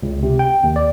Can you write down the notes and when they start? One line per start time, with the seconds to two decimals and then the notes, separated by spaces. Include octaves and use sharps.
0.03 C#2
0.23 C3
0.39 G5
0.63 D#2
0.76 D5